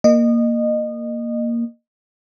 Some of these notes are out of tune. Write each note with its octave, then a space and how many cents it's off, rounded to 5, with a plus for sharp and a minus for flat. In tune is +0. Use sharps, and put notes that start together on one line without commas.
A#3 +0 D#5 -25